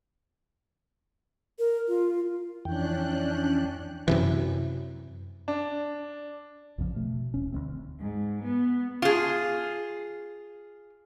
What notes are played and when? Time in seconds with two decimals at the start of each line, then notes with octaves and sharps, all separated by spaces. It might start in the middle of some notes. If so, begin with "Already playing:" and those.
1.59 A#4
1.88 F4
2.65 F2 E3 C#4 D4 G5 F#6
4.08 F#2 C3 E3
5.48 D4
6.78 A#1 F2 C#3 F3
6.96 B2 A3
7.34 D#1 C#4
7.52 D2 G#3 C4
8.00 G#2
8.44 B3
9.02 F4 G#4